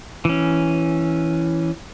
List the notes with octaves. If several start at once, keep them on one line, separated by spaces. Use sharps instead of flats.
E3 C#4